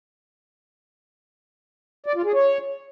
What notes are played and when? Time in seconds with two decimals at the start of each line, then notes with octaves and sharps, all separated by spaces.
2.06 D5
2.15 F4
2.25 G#4
2.34 C#5